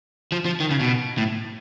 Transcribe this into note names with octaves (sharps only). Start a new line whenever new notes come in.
F3
F3
D#3
C#3
B2
A2